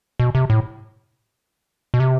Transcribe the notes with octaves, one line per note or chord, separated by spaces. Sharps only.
B2
C3
A2
B2
C3